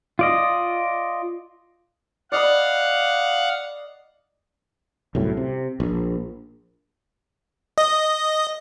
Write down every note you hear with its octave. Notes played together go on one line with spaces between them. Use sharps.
F4 D5 D#5
D5 D#5 F5 F#5 B5
C2 F#2 A2
C3
A#1
D#5